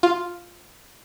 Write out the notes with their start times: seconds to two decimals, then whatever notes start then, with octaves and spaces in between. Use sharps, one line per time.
0.03 F4